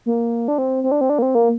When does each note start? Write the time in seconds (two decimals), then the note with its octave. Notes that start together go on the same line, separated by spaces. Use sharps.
0.06 A#3
0.48 D4
0.58 C4
0.84 C4
0.91 D4
1.01 C4
1.10 D4
1.19 A#3
1.22 C4
1.35 A#3